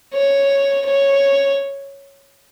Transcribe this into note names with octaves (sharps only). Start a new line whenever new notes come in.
C#5
C#5